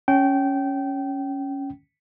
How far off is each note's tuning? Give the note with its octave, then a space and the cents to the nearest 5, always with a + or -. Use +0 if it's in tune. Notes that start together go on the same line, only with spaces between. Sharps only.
C#4 +0 G5 -25